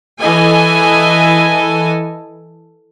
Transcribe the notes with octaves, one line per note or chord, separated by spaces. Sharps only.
E3 A4 D#5 G#5